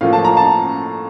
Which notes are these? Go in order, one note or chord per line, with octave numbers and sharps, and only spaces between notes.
A2 F3 A#3 F5
A5
A#5
A5